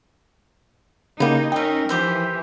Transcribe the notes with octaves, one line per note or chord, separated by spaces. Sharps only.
C#3 A#3 D#4 E4 G4
C#4 D#4 A#4 D#5 E5 G5
E3 F3 G4 C5 E5